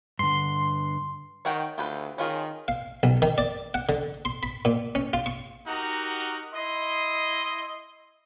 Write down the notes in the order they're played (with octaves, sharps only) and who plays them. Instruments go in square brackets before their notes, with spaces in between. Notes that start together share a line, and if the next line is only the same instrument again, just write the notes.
[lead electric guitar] G2 D3 [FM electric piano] C6
[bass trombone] D#3 [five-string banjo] C#5 F#5 G5
[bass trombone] D2 [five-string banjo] F4 G4 B4
[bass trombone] D#3 [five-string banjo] C#4 F4 G#4
[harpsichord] F5
B1
D#3
D5
F#5
D3
C6
B5
A#2
C#4
F4
C#6
[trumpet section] D#4 F#4 G4 A#4 F#5 A#5
E4 D#5 C6